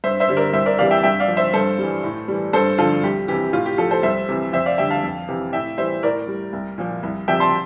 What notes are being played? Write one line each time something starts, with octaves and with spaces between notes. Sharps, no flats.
G2 C5 E5
C5 E5
D3 G3
A#4 D5
C2 C5 E5
A#4 D5
C3 E3 G3 D5 F5
E5 G5
G2 E5 G5
D5 F5
F3
C5 E5
G2 A4 C5
E3 G3
A2
E3 G3
G2 A4 C5
D3 F3 F4 A4
C2 G4
C3 E3 G4
A2 F4
G4
F3 F4 A4
A4 C5
C2 C5 E5
C3 E3
F2 C5 E5
D5 F5
D3 G3 E5 G5
F5 A5
F2
C3 E3
A2 E5 G5
E3 G3 C5 E5
A2 A#4 D5
G3
C2
A#2 F3
C2
C3 F3 E5 G5
A5 C6